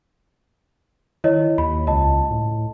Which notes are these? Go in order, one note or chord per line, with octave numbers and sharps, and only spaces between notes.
D#3 E4 C#5 D#5
D#2 B5
C#2 D#5 A5
A2